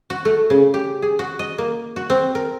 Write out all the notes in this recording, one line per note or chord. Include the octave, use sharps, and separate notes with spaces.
F#4
A3
C#3
G4
G#4
F#4
D#5
A#3
F#4
C4
A#4